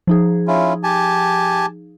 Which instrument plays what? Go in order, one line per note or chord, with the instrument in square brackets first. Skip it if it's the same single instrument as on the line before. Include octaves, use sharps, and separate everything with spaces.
[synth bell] F3 D#4 G#4
[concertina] C#4 E4 F4
G4 G#5 A5